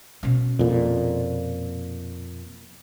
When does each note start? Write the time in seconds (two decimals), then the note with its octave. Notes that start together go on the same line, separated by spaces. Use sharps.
0.23 B2 C#4
0.59 F2 A#2